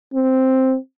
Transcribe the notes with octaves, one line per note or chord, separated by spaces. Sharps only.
C4